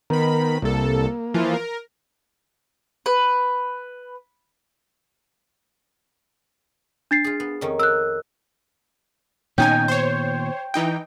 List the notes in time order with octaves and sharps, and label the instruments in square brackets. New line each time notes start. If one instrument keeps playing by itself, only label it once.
[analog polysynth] D#3 B5 [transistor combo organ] B3 A#4
[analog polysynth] C2 A4 [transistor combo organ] A#3
[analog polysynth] E3 F3 F4
A#4
[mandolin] B4
[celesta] D4 A6 C7
[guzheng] F4 G#4
B3
F2 D#3 C#4
[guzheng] A#4 [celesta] E6 F#6
[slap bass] A#2 D#3 B3 [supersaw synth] C#4 D#4 G#5 [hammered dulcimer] G5
[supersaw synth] C5 C#5
E3 D#4 G5